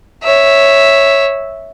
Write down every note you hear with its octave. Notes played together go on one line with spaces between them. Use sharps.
C#5 E5